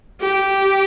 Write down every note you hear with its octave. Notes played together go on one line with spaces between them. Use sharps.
G4